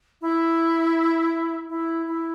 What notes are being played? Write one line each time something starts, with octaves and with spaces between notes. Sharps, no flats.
E4
E4
E4